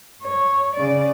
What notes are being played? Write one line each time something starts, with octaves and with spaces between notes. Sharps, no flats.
C#5
C#3 D5